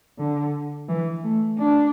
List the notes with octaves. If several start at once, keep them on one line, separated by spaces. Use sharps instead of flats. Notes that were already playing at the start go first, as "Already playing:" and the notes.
D3
E3
A3
D4